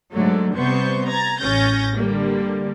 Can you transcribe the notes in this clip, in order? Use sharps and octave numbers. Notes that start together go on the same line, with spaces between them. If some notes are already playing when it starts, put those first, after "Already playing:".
G#2 D3 F#3 A3
C3 G3 B3 C5 C#6 G6
A#5 G#6 A6
A1 C#4 G6 A6 A#6
D3 G3 A#3